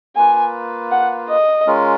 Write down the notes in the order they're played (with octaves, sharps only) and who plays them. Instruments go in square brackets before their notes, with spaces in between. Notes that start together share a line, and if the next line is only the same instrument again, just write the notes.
[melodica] A#3 F4 B4 [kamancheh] G#5
[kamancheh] F#5
D#5
[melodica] G#3 C#4 F4 A#4